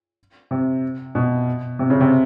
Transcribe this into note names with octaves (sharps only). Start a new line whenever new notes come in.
C3
B2
C3
C#3
C3